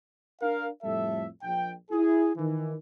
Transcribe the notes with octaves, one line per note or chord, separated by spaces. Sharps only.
D4 A#4 F5
F2 A2 G3 A4 E5
A#1 G5
E4 G#4
D#3 E3